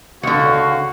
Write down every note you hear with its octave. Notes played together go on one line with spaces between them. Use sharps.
C#2 D3 F#4 F5 C#6 C#7